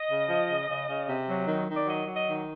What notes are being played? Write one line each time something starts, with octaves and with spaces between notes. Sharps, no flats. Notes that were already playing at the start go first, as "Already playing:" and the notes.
Already playing: D#5
C#3
F3
C#3
C#3
C#3
C3
F#3
D#3
D#3
D5
F#3 D#5
F#3
D#5
D#3